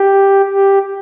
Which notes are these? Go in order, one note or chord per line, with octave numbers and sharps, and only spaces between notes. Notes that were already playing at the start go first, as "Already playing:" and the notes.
Already playing: G4
G4